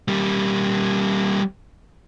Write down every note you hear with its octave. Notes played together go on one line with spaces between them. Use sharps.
G3 A#3